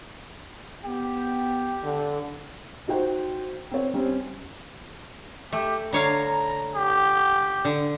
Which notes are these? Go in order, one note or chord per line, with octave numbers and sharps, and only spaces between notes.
B3 G4 G5
D3
D#4 F#4 C5 G5
C4 C#5
G3 C4 C#4
A3 G4
D3 C#5 F5 A#5
G4
D3